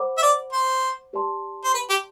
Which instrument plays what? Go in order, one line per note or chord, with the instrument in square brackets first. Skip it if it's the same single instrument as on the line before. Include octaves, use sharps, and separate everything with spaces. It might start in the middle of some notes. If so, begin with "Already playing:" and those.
Already playing: [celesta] C5 F#5 B5 D6
[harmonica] E5
D5
C5
[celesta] G4 B4 D5 A5 C6
[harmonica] C5
B4
G4